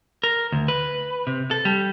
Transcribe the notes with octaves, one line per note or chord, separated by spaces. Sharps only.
A#4
D2
B4
C3
A4
G3